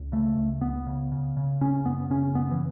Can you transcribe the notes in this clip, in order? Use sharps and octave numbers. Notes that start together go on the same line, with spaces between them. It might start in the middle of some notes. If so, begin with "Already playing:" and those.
Already playing: C#2
C#3 A3
C#2
C#2 B3
C#3
C#3
C#3
C#3 C#4
F#2 B3
C#3 C#4
F#2 B3
E3